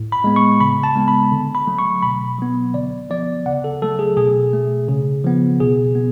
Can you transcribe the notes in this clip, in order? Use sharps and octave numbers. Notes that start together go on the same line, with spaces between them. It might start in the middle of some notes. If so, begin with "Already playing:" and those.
Already playing: A2
B5
G#3 B3
C#6
C#3 B5
A5
G#3 B3
B5
D3
B5
F#3 A3
C#6
B2 B5
F#3 B3
D3 D5
F3 B3 D5
C#3 F#5
A4
F#3 A3 A4
G#4
B2 G#4
A3
C#3
F3 B3
B2 G#4
B3